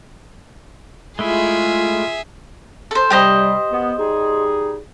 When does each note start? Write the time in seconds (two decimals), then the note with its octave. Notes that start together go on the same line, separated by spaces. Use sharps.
1.19 G#3 A3 E4 F4 G#4 E5
2.91 A4 C5
3.10 C3 G3 G4 C5 D#5
3.72 B3
3.99 G3 D#4 G#4